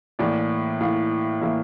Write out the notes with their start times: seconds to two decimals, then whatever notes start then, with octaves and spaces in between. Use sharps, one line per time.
0.19 A2 E3 A#3 D5
0.81 A2 E3 A#3 F5
1.41 A2 E3 A#3 E5